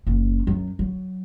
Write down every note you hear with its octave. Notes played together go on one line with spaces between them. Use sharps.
F#1 C#4
F#2
F#3